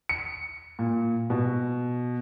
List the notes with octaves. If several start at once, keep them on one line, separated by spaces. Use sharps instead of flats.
C#7
A#2
B2